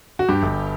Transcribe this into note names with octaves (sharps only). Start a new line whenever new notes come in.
F#4
G2 G4
G1